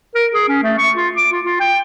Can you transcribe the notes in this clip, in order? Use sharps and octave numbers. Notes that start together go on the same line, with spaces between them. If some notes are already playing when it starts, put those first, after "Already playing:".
A#4
G#4
C#4
A3
C#6
F4
D6
F4
F4
G5